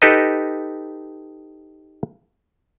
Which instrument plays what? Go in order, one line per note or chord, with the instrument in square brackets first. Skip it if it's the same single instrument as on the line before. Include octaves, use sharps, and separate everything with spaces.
[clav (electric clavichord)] D#4 G4 A4 B4 D#5